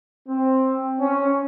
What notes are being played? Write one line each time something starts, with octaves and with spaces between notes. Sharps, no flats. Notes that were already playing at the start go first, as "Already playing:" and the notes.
C4
C#4